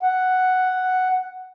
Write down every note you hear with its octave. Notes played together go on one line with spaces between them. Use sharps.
F#5